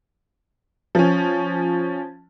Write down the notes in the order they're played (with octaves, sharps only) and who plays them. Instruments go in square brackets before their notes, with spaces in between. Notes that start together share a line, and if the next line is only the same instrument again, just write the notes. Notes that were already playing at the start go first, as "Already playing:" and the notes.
[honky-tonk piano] F3 C#4